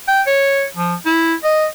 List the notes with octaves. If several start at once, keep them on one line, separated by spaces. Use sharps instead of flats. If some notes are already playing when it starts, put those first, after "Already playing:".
G5
C#5
F3
E4
D#5